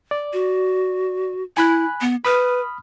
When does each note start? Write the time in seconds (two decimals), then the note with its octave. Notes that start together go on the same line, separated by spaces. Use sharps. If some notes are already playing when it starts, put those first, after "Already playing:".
0.11 D5
0.33 F#4
1.57 E4 G#5 B5 F#6
2.01 B3
2.25 B4 B5 D#6 F6